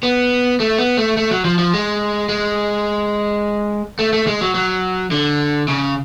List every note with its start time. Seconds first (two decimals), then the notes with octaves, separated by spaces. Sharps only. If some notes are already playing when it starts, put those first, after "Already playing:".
0.03 B3
0.60 A3
0.79 B3
0.97 A3
1.17 A3
1.31 F#3
1.45 F3
1.59 F3
1.73 G#3
2.29 G#3
3.99 A3
4.13 A3
4.27 G#3
4.41 F#3
4.55 F#3
5.11 D3
5.68 C#3